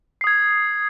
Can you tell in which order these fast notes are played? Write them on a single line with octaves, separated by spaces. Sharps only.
C7 D#6 G#6